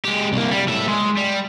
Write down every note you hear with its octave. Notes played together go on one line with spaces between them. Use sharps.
G#3 G4
C2 A#3
G3
A2 E5
G#3
G3